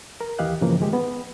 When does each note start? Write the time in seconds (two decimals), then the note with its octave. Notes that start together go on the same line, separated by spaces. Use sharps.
0.21 A#4
0.39 D#2 E3 G4 D#5 F5 F#6
0.61 G2 C#3 E3 F3 A#3
0.80 D#3 G#3 G4
0.93 B3